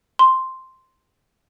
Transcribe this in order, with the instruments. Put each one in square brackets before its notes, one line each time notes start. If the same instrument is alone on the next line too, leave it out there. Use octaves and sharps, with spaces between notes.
[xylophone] C6